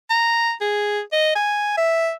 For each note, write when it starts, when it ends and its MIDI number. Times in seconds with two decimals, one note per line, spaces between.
0.10 0.51 82
0.61 1.00 68
1.13 1.33 75
1.35 1.74 80
1.77 2.11 76